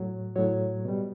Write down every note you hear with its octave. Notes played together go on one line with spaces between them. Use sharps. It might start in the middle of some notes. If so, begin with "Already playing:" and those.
Already playing: A2 F#3
A2 F#3 C#5
B2 G3